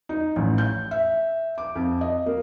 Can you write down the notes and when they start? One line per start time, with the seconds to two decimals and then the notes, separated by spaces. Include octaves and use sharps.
0.09 D#4
0.36 A1
0.58 G6
0.91 E5
1.58 D6
1.75 F2
2.01 D#5
2.26 A#3